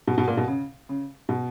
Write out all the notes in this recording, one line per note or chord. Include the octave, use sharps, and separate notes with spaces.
B2
B2
A#2
B2
C#3
C#3
B2